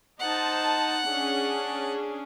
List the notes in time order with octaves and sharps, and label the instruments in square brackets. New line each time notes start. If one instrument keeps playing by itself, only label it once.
[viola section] D#4 C5 A5 [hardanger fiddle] F#5
[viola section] C#4 D4 G#4